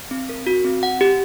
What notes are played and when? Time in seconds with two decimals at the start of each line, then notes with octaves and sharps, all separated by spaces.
0.11 C4
0.29 A#4
0.47 F#4
0.65 C4
0.83 F#5
1.01 G4